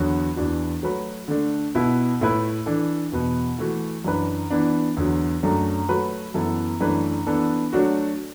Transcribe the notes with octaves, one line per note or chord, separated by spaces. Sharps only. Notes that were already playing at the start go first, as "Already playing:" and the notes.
Already playing: E2 D3 F#3 B3 F#4
E2 E3 D4 F#4
F#3 A3 F#4 B4
D3 A3 D4
B2 B3 E4
A2 A3 E4 B4
E3 D4 A4
E2 B2 B3
E3 A3 F#4
F#2 E3 D4 B4
E3 B3 D4
E2 D3 F#3
F#2 F#3 A3 D4
F#3 A3 F#4 B4
F#2 E3 B3 E4 A4
F#2 E3 A3 D4 B4
E3 B3 D4 A4
F#3 A3 D4 F#4